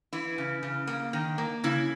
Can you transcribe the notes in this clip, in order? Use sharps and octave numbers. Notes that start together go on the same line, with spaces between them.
E3 E4
C#3
C#3
A#3
D#3
A#3
C#3 E4